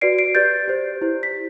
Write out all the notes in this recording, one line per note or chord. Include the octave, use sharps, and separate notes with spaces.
F#4 B4 D5 C7 D7
C7 D7
G4 B4 D5 G6 A6
G4 C5
E4 G4 C5
B6